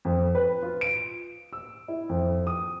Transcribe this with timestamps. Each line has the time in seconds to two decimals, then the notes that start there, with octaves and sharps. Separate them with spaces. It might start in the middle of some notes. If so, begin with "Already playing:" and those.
0.05 F2
0.35 B4
0.63 F4
0.81 D7
1.53 E6
1.88 E4
2.09 F2
2.47 D#6